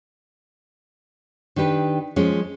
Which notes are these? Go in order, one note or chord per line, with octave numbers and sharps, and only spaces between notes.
D#3 D4 G4 B4
F3 G#3 C#4